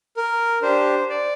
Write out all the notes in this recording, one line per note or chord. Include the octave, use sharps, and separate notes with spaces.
A#4
D4 G4 C5
D5